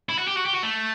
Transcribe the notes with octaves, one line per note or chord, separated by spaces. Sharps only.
E4
F#4
G4
F#4
G4
F#4
A3